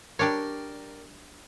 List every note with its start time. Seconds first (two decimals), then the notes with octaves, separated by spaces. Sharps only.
0.19 G3 D4 A#4 C#5 D5 G5